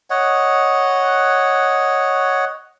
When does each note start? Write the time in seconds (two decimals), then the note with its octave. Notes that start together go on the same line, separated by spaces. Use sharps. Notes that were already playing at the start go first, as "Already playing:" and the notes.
0.10 C#5 D#5 F#5